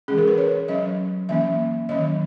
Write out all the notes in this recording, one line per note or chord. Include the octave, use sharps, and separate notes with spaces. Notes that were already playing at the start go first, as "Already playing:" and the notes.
E3 G#3 C#4 G#4
A#4
B4
C#5
F#3 C#4 D#5
E3 A#3 C#4 E5
D#3 F#3 C#4 D#5